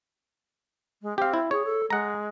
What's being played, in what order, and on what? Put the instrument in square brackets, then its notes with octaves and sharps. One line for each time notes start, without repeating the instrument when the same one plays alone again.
[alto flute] G#3
[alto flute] C4 [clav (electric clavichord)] G4 F5
[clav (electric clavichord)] E4
[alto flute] G#4 [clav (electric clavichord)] C#5
[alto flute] A4
[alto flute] G#3 [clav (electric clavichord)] F#5 A#5